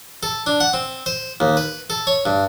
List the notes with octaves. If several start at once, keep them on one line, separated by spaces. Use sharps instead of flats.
A4
D4
F#5
C4
C5
D#2
B4
A4
C#5
G2